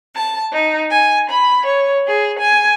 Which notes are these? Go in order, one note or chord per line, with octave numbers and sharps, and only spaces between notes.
A5
D#4
G#5
B5
C#5
G#4
G#5